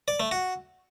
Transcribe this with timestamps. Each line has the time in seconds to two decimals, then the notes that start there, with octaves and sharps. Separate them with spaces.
0.08 D5
0.20 A3
0.31 F#4